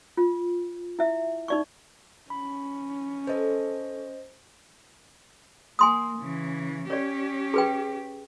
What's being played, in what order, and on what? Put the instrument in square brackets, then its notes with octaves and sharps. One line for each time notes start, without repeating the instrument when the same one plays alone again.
[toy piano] F4
E4 E5
D#4 D5 C#6
[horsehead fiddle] C#4 [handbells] B5
[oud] A4 B4 [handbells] C5 D#5
[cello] A#3 [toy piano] G#5 C6 D#6
[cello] C#3 E3
[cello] C#4 G4 [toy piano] C#5 D5
[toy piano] G#4 B4 G5